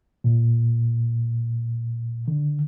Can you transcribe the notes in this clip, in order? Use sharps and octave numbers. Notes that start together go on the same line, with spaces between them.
A#2
D3